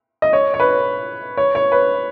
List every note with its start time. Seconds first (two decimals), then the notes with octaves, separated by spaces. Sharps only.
0.22 D#5
0.33 C#5
0.54 C#5
0.60 B4
1.37 C#5
1.55 C#5
1.72 B4